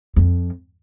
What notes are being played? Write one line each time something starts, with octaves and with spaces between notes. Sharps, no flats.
F2